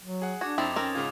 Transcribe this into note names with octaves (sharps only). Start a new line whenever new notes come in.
F#3
G#4 F#5
D4 F#4 D6 G#6
F2 C4 D#4 E4 D#6 A6 F7
D#3 C4 C#4 A#4
G#2 C#3 F4 G#6 F7